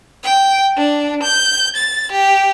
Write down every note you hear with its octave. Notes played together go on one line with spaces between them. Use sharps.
G5
D4
G6
A6
G4